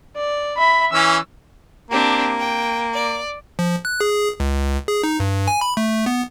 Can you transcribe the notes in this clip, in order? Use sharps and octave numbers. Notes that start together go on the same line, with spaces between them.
D5
E5 B5
E3 C#4 E6
A#3 C4 D4 G4
G5
D5
F3
F#6
G#4
C#2
G#4
D#4
G2
G#5
B5
A3
B3